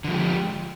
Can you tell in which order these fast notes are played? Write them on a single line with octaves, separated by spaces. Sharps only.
D3 F3 G#3 G4